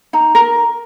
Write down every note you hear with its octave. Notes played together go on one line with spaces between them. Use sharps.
D#4 A#5
A#4